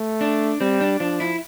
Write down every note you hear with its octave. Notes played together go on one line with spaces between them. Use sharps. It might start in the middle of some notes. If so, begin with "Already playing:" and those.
Already playing: A3
D4
G3 C4
D4
F3 D4
E4